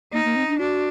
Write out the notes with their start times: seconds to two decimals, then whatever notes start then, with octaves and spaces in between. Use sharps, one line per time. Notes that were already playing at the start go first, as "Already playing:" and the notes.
0.13 A#3 D#4
0.24 A#3
0.36 C4
0.48 D4
0.59 D4 F#4